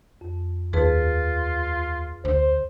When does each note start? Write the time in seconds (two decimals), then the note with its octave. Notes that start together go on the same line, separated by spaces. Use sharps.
0.21 F2
0.73 D#2 F4 G#4 B4 A5
2.25 D2 C5